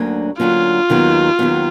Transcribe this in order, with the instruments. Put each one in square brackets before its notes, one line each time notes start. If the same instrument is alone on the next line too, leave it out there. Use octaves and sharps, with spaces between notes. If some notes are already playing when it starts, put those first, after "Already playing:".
Already playing: [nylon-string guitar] D2 D3 F#3 A#3 C#4
[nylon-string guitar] D2 D3 F#3 A#3 C#4 [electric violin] F4
[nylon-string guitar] D#2 D#3 F#3 B3
D#2 D#3 F#3 B3